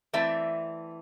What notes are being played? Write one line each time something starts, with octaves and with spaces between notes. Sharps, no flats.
E3 A3 C4 D5 E5